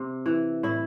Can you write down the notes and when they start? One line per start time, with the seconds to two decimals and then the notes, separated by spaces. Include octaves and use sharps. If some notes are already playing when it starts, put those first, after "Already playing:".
Already playing: C3
0.26 E3
0.63 A2 E4